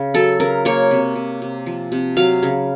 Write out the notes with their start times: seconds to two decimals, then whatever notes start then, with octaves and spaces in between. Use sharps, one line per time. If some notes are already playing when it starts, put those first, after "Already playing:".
Already playing: C#3
0.14 F#3 A4
0.40 C#3 A#4
0.65 A#3 C#5
0.91 C3
1.15 C3
1.42 C3
1.66 F3
1.92 C3
2.17 F#3 F5
2.43 C#3